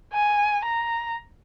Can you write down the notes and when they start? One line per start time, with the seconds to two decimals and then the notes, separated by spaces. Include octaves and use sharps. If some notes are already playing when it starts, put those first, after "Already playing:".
0.13 G#5
0.64 A#5